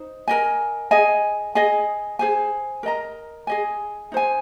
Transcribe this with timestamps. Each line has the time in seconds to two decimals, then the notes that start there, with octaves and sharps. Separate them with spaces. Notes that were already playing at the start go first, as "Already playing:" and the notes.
Already playing: D#4 C5
0.28 A#4 D#5 G#5
0.91 G#4 D#5 G#5
1.55 G#4 D#5 G#5
2.19 G#4 C5 G#5
2.83 A#4 D#5 A#5
3.47 G#4 D#5 G#5
4.12 D#4 C5 G#5